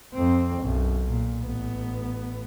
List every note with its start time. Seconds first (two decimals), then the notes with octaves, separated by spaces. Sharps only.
0.13 F2 C4
0.62 B1 F#2
1.07 A#2
1.41 A1 B3